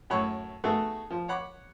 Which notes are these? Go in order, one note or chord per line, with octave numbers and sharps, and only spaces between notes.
F#2 A2 C#5 B5 C#6
A3 B3 D#4 F#4 G#4 A4
F3
C#5 F#5 B5 D6